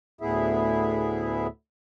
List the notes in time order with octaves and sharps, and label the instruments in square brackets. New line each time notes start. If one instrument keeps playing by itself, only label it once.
[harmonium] D2 A2 B3 E4 G#4 E5